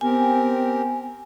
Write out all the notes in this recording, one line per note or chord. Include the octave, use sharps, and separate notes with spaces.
B3 C4 G4 A#4 G#5